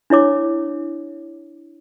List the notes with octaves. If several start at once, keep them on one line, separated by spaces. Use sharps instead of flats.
D4 E4 C#5 D6